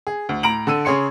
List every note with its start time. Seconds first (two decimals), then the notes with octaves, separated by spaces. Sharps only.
0.07 G#4
0.29 D2
0.43 A2 A#5 D7 F#7
0.67 D3 A4 E6 D#7
0.85 C#3 G#4 C#5 C6 C#7